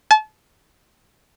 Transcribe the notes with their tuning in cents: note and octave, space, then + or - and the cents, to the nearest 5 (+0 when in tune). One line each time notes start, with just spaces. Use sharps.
A5 -35